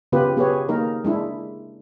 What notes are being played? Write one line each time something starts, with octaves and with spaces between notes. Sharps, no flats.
C#3 B3 F4 G4 B4
B3 G4 G#4 B4 C#5
A#3 D#4 A#4
G#3 D4 E4